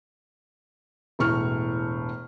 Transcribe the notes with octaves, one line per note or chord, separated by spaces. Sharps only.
E1 A2 C#6 F6